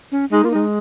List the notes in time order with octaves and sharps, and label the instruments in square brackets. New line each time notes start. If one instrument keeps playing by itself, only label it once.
[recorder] C#4
[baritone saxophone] G#3 [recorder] D#4
[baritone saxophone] A#3 [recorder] F4
[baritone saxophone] G#3 [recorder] D#4